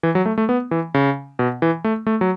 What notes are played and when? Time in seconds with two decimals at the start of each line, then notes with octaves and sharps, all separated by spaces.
0.03 E3
0.15 F#3
0.26 A3
0.38 A3
0.49 B3
0.71 E3
0.94 C#3
1.39 B2
1.62 E3
1.84 A3
2.07 A3
2.21 F#3